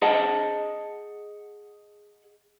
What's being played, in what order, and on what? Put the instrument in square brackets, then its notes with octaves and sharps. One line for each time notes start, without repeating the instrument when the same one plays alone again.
[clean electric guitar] G#4 D#5 F#5 A5